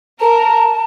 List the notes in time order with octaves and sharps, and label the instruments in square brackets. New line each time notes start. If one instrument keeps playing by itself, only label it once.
[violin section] A#4 [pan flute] A5